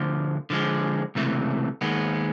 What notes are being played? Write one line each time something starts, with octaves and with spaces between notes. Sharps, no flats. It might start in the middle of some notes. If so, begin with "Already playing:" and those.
Already playing: D2 D3 F3
D3 F3 G#3
C#2 C3 E3 A3
D#2 D#3 G#3 B3